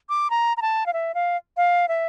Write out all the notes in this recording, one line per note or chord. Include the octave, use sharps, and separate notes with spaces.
D6
A#5
A#5
A5
F5
E5
F5
F5
E5